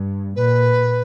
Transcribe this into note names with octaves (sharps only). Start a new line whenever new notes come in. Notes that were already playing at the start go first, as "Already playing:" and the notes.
Already playing: G2
A#2 B4